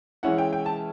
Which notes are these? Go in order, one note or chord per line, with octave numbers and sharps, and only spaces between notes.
E3 G#3 C#4 E4 F#5
G5
G5
A5